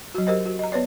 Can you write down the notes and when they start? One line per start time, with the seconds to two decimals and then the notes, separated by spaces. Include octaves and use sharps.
0.15 F#3 F#4
0.27 G4 A#4 C5 D#5
0.46 F#4
0.59 D#5 A#5
0.72 B3 B4 C#5 D5